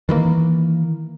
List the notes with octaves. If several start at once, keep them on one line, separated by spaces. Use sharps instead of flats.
D#3 E3 G3 A#3